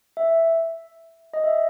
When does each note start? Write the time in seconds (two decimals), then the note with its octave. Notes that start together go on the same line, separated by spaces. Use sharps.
0.17 E5
1.34 D#5
1.44 E5